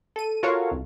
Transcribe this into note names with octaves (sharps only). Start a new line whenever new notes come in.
A4 D#7
F4 F#4 A4 A#4 C#5 F5
C2